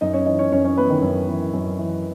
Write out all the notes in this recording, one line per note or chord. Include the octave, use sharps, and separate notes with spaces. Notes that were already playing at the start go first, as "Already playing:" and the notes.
F#2 D#4 D#5
C#4 C#5
E3 D#4 D#5
C#4 C#5
F#2 C#4 C#5
C#4 C#5
E3 B3 B4
D#3 D#4
F#2
E3
F#2
E3